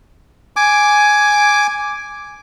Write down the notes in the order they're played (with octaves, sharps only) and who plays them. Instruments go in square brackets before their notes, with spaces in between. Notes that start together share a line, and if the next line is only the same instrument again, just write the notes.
[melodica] G#5 D6